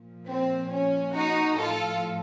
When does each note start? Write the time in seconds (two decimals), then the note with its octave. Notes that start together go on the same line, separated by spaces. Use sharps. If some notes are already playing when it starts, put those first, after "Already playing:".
Already playing: A#2 F3
0.29 C4
0.72 C#4
1.15 D#4 F#4
1.58 A2 F3 F4 A4